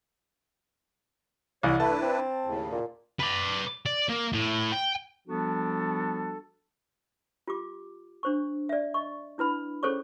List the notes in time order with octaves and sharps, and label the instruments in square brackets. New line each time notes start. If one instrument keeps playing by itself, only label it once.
[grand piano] C2 E3 [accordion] C#5
[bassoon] A3 [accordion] D4 E4 B4 [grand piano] A5
[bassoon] C4
[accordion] D#2 A2 C#3
[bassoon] A#2
[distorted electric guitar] B4 D5
D5
A#3
A2
G5
[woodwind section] F3 G3 B3 D4 F#4 A4
[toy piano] F4 G4 D6
D4 C5 C#6
D5 E5
D#5 C#6
D4 E4 B4 B5
C#4 G#4 A4 C5 C#5 C#6